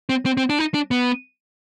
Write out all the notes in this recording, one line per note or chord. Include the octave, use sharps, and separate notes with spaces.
C4
C4
C4
D4
D#4
D4
B3